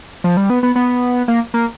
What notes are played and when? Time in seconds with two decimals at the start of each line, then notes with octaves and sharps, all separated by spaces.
0.24 F3
0.37 G3
0.50 B3
0.63 B3
0.76 B3
1.28 A#3
1.54 A#3